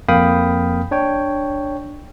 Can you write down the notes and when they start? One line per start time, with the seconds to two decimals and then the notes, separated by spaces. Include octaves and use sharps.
0.09 F2 A#3 F5 G5 B5 D#6
0.91 D4 C#5 G5